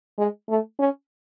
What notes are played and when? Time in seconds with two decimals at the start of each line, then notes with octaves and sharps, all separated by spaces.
0.18 G#3
0.49 A3
0.79 C#4